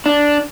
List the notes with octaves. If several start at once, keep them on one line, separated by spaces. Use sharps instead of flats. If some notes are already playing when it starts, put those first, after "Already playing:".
D4